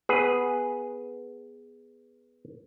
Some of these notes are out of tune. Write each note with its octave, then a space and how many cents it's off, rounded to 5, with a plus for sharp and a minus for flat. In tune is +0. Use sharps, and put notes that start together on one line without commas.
B3 +0 G#4 +0 B4 +0